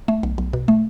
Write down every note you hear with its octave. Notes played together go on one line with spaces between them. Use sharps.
A3
B1
B1
B2
A3